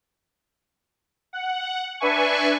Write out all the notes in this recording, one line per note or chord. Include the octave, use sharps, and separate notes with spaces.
F#5
D4 B4 E5 G#5 C#6